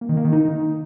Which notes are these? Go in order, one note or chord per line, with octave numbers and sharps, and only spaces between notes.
A#3
D#3
A#3
D#3
D#4